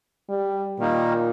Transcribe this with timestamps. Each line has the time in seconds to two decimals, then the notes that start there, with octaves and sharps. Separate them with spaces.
0.29 G3
0.79 A#2 D#3 G3 A#3 D#4